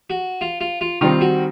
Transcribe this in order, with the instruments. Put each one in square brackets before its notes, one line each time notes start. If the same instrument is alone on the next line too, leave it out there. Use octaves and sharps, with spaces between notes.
[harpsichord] F#4
F4
F4
F4
[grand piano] D#3 G3 C4 D#4 [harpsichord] F4
[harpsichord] F#4